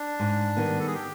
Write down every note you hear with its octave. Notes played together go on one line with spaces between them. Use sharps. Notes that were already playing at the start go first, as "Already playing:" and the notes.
Already playing: D4
G#2
D#3 G3 B3
A4
G#4
G4